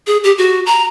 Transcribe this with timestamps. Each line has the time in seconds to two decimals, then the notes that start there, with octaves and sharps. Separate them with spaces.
0.07 G#4
0.24 G4
0.38 F#4
0.66 A#5